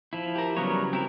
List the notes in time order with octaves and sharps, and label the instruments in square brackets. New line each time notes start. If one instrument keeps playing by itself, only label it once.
[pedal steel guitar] F3 E4
[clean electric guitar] G4 A#4
[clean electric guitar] C#3 F#3 B3 [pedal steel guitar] G3 A#4 C#5
[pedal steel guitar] C4 E4 A#4